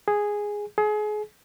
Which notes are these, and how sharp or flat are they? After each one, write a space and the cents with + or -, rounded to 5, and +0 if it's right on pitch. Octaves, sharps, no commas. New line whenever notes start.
G#4 -5
G#4 +30